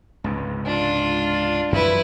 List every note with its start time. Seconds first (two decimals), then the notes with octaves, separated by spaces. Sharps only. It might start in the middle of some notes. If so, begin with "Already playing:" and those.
0.24 C#2 G#2 C3
0.66 D4 F4
1.72 F#2 E3 F3 E4 B4